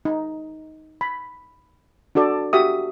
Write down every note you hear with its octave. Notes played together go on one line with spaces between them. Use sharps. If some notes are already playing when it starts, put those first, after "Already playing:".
D#4
B5
D4 F#4 A4 D5
F#4 G4 E5 D#6